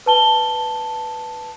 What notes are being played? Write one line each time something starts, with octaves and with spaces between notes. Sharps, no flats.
B4 A5 G7